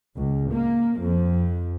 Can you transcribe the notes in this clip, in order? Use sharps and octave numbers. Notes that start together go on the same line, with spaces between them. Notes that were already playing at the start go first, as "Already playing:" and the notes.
C#2
A#3
F2